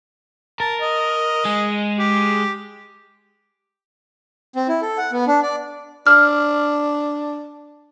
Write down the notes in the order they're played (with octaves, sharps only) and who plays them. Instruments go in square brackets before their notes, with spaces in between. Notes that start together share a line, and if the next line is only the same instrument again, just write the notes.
[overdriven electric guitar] A#4 [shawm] A5
[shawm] D#5
[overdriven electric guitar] G#3 G#4
[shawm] G4
[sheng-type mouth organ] C4
E4
A4
F#5
B3
D4
D5
[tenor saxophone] D4 [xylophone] F6